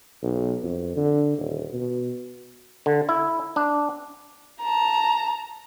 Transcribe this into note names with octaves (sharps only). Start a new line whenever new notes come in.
B1
F2
D3
D#1
B2
D3
E4
D4
A5 A#5